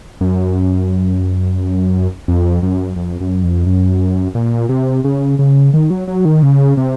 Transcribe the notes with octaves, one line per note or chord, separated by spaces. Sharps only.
F#2
F2
F#2
F2
F#2
F2
F#2
A#2
C3
C#3
C#3
D#3
F#3
F#3
D#3
C#3
C3